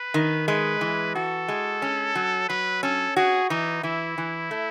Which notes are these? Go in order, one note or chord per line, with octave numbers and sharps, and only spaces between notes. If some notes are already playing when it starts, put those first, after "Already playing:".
Already playing: B4
D#3
G#3 B4
E3
F#4 A4
G#3
C#4
F#3
F#3 B4
C#4 A4
F#4 G#4
E3 D#4
E3 E4
E3
A3